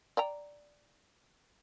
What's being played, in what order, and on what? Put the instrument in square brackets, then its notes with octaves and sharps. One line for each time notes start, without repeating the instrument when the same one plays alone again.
[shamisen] D5 G5 A#5